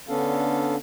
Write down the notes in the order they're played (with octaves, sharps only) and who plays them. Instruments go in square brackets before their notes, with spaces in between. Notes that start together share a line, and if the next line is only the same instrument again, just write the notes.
[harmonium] D3 B3 C#4 D4 A4 F5